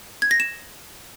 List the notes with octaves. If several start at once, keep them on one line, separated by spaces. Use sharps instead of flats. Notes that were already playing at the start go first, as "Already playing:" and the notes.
G#6
A#6
E7